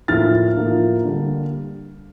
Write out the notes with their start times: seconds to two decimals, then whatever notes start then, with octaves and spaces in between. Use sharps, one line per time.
0.08 A2 F3 A#3 F6 A6
0.56 A2 F3 A#3
1.04 D3 G3 A#3